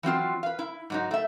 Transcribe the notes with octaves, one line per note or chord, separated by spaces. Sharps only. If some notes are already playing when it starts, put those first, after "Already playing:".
E3 F#3 C4 F4
B4 F5
E4
G#2 F#3 D#4
A3 E5